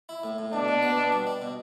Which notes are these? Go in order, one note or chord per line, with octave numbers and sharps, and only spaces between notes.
E4
A2
A2
B2 D4
B2
B3
B2
G3
D4
B2